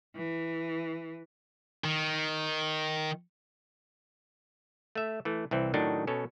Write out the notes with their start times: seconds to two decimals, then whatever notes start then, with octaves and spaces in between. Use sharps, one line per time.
0.15 E3
1.84 D#3
4.95 A3 E5
5.25 E3 A3
5.51 C2 E3 C4
5.74 A2 D#3 F#3 D4 D#4
6.07 B2 C#4 A4